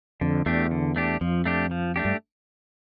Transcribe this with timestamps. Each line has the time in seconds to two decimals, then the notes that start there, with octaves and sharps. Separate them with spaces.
0.21 F2 D3
0.46 E2 A3 D4 G4
0.71 D3
0.96 A3 D4 G4
1.21 F2 F3
1.46 A3 D4 G4
1.71 F3
1.96 A3 D4 G4
2.05 G2